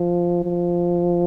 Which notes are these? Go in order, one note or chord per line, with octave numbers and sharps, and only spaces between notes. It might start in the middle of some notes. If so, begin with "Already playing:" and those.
Already playing: F3
F3